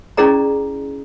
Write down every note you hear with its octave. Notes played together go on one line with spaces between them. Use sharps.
C#4 E4 G#4 D5 A#5